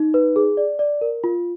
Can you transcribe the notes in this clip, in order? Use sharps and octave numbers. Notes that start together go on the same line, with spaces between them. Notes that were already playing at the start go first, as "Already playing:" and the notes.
Already playing: D#4
B4
G#4
D5
D5
A#4
F4